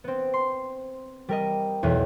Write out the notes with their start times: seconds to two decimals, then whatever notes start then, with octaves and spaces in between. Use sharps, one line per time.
0.04 B3 C4
0.34 C6
1.29 G3 A#4 D#5
1.83 B1 E2 E3